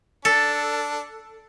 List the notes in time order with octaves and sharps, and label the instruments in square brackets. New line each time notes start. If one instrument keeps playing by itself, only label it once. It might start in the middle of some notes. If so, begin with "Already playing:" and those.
[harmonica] D4 [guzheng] A4